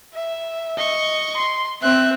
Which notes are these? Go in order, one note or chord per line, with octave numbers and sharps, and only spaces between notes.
E5
D#5 C#6
C6
C4 E5 F#6